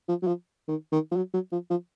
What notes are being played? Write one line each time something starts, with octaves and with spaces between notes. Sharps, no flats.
F3
F#3
F3
D#3
D#3
F3
F#3
F#3
F3
F3